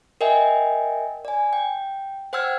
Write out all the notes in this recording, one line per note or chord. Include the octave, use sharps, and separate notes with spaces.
A#4 D#5 E5 G5 G#5
D5 G#5
G5
C5 F#5 G5 E6 F6 G#6